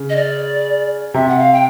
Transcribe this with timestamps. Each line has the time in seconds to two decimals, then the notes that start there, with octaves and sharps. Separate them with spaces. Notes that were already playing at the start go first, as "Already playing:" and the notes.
Already playing: C#3
0.09 D#5
0.16 D5
1.14 C3 E5
1.28 F#5
1.39 F5
1.53 G5